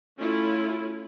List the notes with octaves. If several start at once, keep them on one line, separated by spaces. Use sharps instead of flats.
A3 C#4 E4 F4